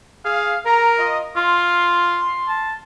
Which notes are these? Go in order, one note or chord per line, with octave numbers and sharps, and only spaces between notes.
G#4 F5
A#4 A#5
F4 D#5
F4 C6
A5